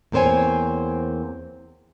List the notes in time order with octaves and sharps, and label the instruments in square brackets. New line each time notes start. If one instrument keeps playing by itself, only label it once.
[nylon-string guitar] E2 A#3 C4 C5 C#5 G#5